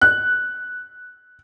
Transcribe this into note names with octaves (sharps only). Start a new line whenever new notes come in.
F#6